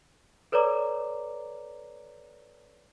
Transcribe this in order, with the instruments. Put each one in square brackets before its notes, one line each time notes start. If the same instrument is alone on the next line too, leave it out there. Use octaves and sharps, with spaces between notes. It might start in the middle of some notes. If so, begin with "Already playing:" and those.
[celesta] A4 B4 C#5 D5 A#5 D6